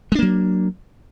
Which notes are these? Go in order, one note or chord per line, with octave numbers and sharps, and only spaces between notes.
F#3 G#3 A#3 D4